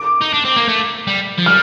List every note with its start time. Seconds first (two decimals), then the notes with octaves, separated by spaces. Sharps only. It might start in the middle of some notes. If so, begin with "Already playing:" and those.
Already playing: D6
0.21 D#4
0.33 D4
0.45 C4
0.56 A#3
0.68 A3
1.07 G3
1.39 F3
1.46 G3 F6